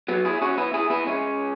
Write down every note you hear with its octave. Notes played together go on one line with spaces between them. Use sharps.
F#3 B3
E4 G#4
C#4 F#4
B3 E4
E4 G#4
B3 E4
G#3 C#4